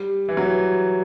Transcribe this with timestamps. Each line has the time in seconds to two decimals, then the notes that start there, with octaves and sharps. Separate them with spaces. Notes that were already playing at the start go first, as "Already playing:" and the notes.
Already playing: G3
0.29 E3
0.37 F#3
0.45 E3